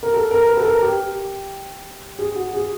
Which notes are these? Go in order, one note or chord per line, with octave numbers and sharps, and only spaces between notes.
A#4
A4
A#4
B4
A4
A#4
G4
G#4
F#4
G#4